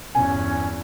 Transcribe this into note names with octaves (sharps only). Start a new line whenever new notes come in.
E2 G2 C#4 G#5